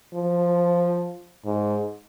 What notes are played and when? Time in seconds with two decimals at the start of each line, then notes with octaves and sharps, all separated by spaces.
0.14 F3
1.45 G#2